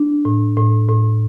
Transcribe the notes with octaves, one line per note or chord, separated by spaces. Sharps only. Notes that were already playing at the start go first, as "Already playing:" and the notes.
Already playing: D4
A2
A2
A2